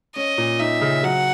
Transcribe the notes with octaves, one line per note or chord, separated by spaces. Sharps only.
C#4 D#5
A#2
D#4 E5
C#3
F#3 F#5